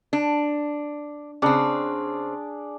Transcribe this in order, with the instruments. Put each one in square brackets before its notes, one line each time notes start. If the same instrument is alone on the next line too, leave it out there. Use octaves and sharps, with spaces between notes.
[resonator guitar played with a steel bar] D4
[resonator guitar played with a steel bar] C#3 C4 [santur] D4 G#4 D5